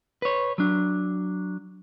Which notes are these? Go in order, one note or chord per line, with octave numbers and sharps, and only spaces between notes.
B4 C#5
F#3 D4